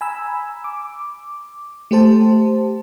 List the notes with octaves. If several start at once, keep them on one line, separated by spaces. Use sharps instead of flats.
G#5 A#5 B5 E6
D6
A3 G4 C5 A5